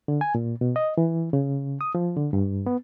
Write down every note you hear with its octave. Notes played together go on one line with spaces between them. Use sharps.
D3
G#5
A#2
B2
D#5
E3
C#3
D#6
F3
D3
G2
B3